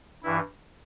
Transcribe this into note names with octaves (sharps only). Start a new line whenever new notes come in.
G2 E3 E4